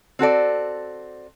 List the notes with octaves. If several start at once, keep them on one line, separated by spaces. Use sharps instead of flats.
C4 F#4 A4 D5